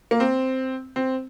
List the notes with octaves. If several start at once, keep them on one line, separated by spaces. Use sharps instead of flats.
A#3
C4
C4